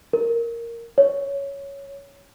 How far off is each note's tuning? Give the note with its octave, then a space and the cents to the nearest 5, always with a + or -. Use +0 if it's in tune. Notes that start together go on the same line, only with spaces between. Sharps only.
A#4 -5
C#5 +5